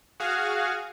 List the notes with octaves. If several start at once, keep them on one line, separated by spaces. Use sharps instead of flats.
F#4 G#4 F5